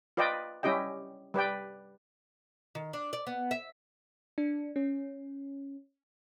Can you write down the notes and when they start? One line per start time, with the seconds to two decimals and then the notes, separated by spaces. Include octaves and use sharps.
0.17 F4 B4 D5 D#5 G5
0.63 G3 C#4 E4 G4 D#5 G5
1.34 G3 B4 D5 G5
2.75 D#3
2.93 D4
3.13 D5
3.27 B3
3.51 E5
4.38 D4
4.76 C#4